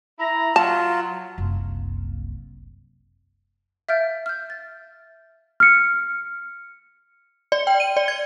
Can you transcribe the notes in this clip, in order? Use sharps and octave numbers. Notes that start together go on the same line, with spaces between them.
E4 A#5
F#3 F4 A5
F#1 C2
E5 F5 F6 G6 A6 D7
F6 G6
A6
F6 C#7
D5
G5
D#7
D5
G#6